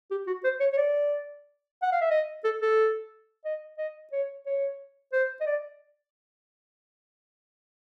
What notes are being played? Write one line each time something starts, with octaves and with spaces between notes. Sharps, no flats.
G4
F#4
C5
C#5
C#5
D5
F#5
F5
E5
D#5
A4
A4
D#5
D#5
C#5
C#5
C5
D#5
D5